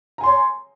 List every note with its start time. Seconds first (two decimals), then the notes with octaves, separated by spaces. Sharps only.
0.18 A#5
0.21 G#5
0.23 C6
0.26 C#5